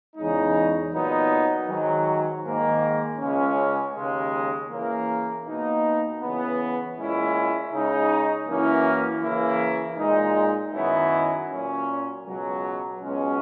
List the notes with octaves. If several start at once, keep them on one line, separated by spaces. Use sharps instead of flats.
E2 C#3 G#3 D#4
A#2 F#3 B3 D#4
G#2 D#3 F#3
G#2 D#3 A#3
C#2 C#3 G#3 C#4
D#2 C#3 G#3
C#3 E3 A#3
B2 A#3 D#4
C#3 E3 B3
A#2 G#3 C#4 E4
C#3 G#3 D#4
F#2 E3 A#3 C#4 E4
C#3 E3 A#3 E4
A#2 G#3 D#4
F#2 D#3 F#3 B3 E4
A#2 F#3 C#4
C#2 B2 F#3
C#2 B2 G#3 C#4